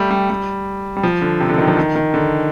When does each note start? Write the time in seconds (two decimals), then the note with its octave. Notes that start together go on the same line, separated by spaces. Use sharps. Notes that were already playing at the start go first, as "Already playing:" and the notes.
Already playing: G3 A3
0.11 G3
0.30 G3
0.97 G3
1.03 F3
1.22 D3
1.40 C3
1.49 D3
1.58 D#3
1.68 F3
1.77 D#3
1.96 D#3
2.14 D3